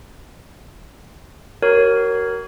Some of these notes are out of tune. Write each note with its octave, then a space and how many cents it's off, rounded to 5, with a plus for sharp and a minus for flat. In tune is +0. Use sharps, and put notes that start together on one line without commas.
F#4 +40 A#4 +0 C#5 -10